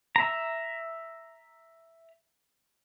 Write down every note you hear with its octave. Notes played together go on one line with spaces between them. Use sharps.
E5 A#5